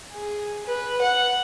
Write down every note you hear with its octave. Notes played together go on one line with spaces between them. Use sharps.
G#4
B4
F#5